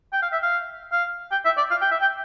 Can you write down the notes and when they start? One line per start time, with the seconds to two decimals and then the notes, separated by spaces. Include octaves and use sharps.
0.13 G5
0.22 F5
0.32 E5
0.43 F5
0.92 F5
1.32 G5
1.45 E5
1.57 D5
1.71 F5
1.82 G5
1.91 E5
2.01 G5